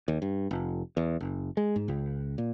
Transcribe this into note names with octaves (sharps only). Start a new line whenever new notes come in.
D#2
G2
F1
E2
F#1
G#3
G#2
C#2
A#2